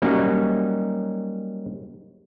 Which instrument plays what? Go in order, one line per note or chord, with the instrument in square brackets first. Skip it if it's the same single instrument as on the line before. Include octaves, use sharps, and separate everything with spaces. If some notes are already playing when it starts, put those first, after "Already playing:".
[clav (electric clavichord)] F#3 G3 A#3 C#4 D#4 F#4